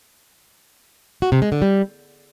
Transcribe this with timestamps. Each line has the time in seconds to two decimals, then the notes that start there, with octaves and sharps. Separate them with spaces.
1.22 F#4
1.32 C3
1.42 G#3
1.52 D3
1.62 G3